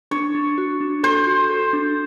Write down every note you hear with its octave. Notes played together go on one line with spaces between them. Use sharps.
D4 C#5
D4
F#4
D4
A4 C5
F#4
A4
D4